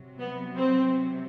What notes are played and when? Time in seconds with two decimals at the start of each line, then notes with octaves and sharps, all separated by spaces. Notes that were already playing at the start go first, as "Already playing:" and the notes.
Already playing: C3 F#3
0.19 B3
0.56 C4